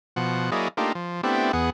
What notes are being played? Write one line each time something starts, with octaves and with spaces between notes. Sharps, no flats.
B2 F3 F#5
F#3 A#3 E4 G#4 D5 D#5
A3 A#3 D4 D#4 F4 G4
F3
A3 B3 C4 D4 E4 G4
E2 B3 G#4 F#5